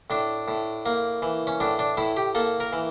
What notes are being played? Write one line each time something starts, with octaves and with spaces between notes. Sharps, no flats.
A2 D4
A2
A#3
E3
C#4
A2 D4
D4
A2 E4
G4
A#3 A4
A#4
E3